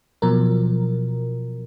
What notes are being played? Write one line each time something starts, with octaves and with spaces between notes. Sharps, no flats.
B2 F3 F#3 A#4